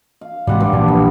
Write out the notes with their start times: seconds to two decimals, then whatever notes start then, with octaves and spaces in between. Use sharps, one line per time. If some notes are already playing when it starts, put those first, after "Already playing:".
0.21 F5
0.47 G#2 C3 E3 G3 F#5 C6
0.60 G2
0.73 A#1 E3 A#3 D4
0.88 B3